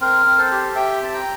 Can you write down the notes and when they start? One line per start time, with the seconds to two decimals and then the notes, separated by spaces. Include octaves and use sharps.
0.01 C4 A#4
0.26 C4
0.38 A4 C5
0.52 G4
0.75 G4 E5 G5
1.02 C4 A5
1.14 G5 A#5